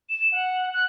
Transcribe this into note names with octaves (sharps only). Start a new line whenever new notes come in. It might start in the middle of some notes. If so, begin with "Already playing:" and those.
E7
F#5
F#6